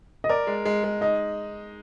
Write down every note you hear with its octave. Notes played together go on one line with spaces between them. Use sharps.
D#5
A#4 D5
G#3
G#3
G#3
D#4 D#5